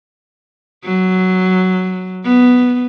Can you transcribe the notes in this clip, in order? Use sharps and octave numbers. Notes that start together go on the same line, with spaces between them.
F#3
B3